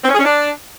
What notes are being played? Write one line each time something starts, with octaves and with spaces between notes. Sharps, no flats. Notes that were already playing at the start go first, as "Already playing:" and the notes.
C4
C#4
G#4
C#4
D4